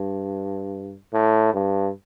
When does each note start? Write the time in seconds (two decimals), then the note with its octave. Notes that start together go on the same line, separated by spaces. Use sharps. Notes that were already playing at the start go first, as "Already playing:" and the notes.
Already playing: G2
1.13 A2
1.54 G2